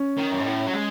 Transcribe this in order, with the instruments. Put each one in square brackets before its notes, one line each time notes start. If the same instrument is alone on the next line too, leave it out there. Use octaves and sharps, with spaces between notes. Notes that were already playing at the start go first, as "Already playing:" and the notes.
Already playing: [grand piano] C#4
[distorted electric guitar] D#3
F#2
G#2
A2
F#3
G#3